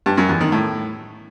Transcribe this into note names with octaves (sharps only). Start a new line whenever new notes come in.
G2
F#2
E2
D#3
A2